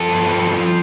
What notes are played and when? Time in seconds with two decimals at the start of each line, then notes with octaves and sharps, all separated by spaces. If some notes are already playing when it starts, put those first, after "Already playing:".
Already playing: F3 A4
0.08 G2
0.30 F3
0.51 F3